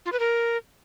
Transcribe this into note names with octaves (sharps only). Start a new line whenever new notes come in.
F4
B4
A#4